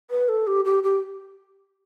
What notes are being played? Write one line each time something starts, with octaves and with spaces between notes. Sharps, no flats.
B4
A4
G4
G4
G4